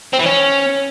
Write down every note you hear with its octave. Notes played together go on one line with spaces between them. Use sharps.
C4
E3
C#4